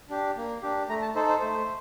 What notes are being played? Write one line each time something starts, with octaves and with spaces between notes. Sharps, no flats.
D4 G4
A#3
D4 G4
A3 A#5
A5
D#4 A4 C5
C5
A3 C5